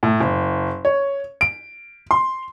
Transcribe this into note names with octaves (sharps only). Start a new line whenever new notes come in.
A2
F#1
C#5
D7
C6